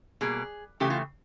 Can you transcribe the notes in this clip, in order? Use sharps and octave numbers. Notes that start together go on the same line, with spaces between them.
B2 G3 A#3 G#4
C#3 E3 A3 G4
F4